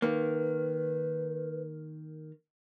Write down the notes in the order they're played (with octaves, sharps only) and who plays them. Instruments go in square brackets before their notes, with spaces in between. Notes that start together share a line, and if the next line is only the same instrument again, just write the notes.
[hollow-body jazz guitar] D#3 A#3 [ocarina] B4